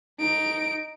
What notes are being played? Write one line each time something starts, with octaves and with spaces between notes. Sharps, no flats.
D#4 D7